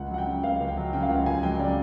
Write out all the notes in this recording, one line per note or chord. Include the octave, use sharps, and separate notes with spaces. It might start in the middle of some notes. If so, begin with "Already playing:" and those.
Already playing: C#2 F#5
F#3 F#5
G5
C#3
C#2 F5
C#2
G5
F#3
C#3 G5
F5
C#2 F#5
C#2 G#5
F#3 G5
C#3 D5